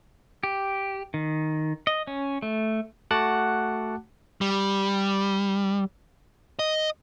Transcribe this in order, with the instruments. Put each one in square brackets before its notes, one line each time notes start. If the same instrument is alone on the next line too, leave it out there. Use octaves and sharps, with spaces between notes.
[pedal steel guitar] G4
D#3
D#5
C#4
A3
[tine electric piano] A3 F#4 F#5 A5 D6 F#6
[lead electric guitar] G3
D#5